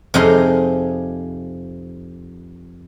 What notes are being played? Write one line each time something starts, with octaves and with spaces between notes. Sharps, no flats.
F2 C3 D#4 G#4 F5 C6